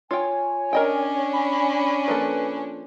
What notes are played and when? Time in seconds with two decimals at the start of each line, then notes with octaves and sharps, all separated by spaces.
0.11 F4 C#5 G5 G#5
0.73 C#4 D4 A#4 D#5 G5
1.33 B5
2.08 F3 A#3 A4 B4